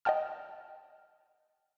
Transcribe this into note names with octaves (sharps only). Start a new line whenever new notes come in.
D#5 F#5 G5 A5 F6